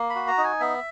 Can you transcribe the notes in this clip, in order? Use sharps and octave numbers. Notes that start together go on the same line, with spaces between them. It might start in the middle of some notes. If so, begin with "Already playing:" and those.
Already playing: A#3
B5
F#4
A#5
D#4
G#5
B3 E5